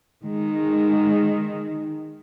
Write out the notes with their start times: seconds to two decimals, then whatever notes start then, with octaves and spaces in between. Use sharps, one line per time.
0.24 D#3 G#3